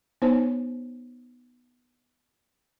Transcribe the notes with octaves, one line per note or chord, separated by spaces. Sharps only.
B3 D#4 C5 C#5 G#5 A5